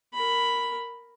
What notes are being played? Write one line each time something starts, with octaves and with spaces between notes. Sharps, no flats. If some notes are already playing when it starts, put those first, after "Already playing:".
A#4 B5